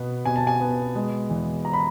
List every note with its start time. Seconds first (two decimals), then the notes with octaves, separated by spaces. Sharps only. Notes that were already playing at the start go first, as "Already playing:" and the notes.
Already playing: B2 B3
0.25 B2 G#5
0.36 A5
0.47 G#5
0.61 B3
0.95 G#3
1.30 E2
1.65 A#5
1.73 B5